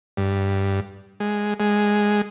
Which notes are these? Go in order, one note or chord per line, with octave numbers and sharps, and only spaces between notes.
G2
G#3
G#3